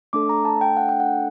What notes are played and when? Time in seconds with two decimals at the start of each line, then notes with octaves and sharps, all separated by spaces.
0.13 A3 D4 A4 D6
0.29 A#5
0.45 A5
0.61 G5
0.77 F#5
0.89 G5
1.00 F#5